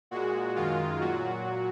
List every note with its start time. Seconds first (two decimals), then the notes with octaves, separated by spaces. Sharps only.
0.11 A#2 G#3 F#4
0.56 F#2 D#3 G#3 F4
1.00 A#2 F#3 F#4